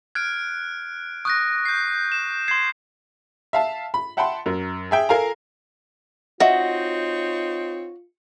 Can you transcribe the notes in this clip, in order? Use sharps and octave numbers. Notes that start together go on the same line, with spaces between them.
F6 F#6 G#6 D7
C#6 D#6 F#6 A#6
G6 C7
E7
C6 G#6 C7
E5 F5 A5
B5
E5 F#5 G5 A5 B5 C6
F#2 A#4
G#4 E5 G5
A4 A#4 F5 G#5 A#5
C4 D#4 F4 F#4 C#5 D#5 E5